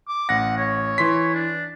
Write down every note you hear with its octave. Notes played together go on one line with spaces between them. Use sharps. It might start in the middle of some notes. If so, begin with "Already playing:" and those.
D6
A1 F#5 A#6
C#5
E3 C6 B6
D4